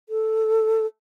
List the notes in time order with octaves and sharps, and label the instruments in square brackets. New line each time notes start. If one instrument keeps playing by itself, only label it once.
[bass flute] A4